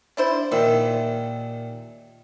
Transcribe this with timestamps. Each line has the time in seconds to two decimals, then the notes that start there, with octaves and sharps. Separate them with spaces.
0.17 D4 E4 C5
0.52 D#2 A#2 D#3 E5